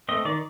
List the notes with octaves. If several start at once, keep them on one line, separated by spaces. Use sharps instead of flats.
A3 C4 D#5
D#3 D5